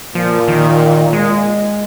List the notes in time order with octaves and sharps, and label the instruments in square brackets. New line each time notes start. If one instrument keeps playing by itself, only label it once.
[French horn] A#2 [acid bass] F3
[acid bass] D#3
G#3